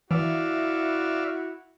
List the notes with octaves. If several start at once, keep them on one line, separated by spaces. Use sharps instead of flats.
E3 E4 F#4 D5 E5 F5